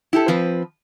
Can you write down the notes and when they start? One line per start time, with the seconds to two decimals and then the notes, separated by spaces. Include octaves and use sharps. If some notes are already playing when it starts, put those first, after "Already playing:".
0.13 E4 G4 A4
0.28 F3 C4 B4